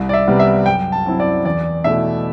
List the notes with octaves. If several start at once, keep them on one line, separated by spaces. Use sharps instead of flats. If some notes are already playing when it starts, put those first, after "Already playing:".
Already playing: C2
D5
E5
C3 G3 B3
E5
F#2 G5
A5
F#3 C4 E4
D5
E2 D5
B2 A3 E4 E5